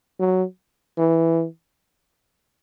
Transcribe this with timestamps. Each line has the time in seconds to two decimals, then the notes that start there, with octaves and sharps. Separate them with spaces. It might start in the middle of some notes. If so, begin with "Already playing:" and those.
0.19 F#3
0.98 E3